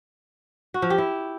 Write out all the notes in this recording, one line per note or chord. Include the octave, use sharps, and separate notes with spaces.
F#4
F3
G4
E4